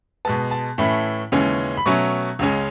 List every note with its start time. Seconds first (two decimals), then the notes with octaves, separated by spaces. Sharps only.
0.25 B2 G#3 B3 A5
0.51 A5
0.78 A2 E3 A3 C#4 B5
1.32 D#2 C#3 E3 G#3 C#4
1.77 B5
1.86 B2 F#3 A3 C#4 C#6
2.39 C#2 C#3 G#3 C#4